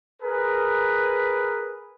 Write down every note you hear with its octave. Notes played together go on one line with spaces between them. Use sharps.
G#4 A#4 B4